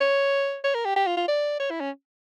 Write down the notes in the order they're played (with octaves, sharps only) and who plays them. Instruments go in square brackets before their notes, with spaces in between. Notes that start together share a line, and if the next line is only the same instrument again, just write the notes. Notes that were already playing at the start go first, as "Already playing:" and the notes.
[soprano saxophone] C#5
C#5
A#4
G4
G4
F4
F4
D5
C#5
E4
C#4